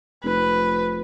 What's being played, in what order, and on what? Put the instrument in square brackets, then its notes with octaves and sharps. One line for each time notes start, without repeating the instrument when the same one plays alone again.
[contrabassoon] F1 [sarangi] B4